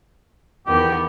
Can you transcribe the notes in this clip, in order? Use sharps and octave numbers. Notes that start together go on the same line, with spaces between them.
E2 D#3 B3 G4